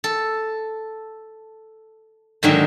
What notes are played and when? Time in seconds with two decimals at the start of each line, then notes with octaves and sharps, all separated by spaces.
0.04 A4
2.43 G#2 D3 D#3 F#3 A#3